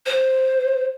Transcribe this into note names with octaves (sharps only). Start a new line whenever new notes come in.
C5